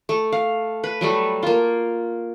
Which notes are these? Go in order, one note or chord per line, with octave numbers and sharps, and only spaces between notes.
A3
F5
B4
F#3 G3 A3
A#3 F4